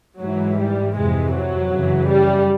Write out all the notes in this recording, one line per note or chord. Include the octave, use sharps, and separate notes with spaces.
G#2 E3 F#3
G3
F2 C3 E3 G#3
F#3
F#2 C#3 E3
G3